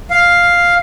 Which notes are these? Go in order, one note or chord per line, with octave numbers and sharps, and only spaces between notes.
F5